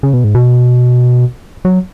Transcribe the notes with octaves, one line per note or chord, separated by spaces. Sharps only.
C#3
B2
G#2
B2
F#3